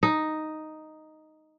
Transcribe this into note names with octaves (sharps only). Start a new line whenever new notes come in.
D#4